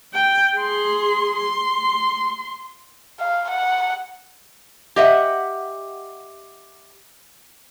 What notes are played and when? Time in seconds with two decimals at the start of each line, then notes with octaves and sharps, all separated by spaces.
0.14 G5
0.57 G#4 C6
1.37 C6
3.20 F5
3.50 F#5
4.96 G4 D#5 E5 F#5